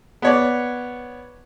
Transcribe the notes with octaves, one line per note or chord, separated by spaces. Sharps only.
B3 C#5 D5